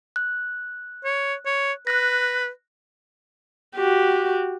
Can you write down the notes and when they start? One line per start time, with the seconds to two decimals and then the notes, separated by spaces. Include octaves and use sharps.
0.16 F#6
1.04 C#5
1.45 C#5
1.87 B4 F#6 A#6
3.76 F#4 G4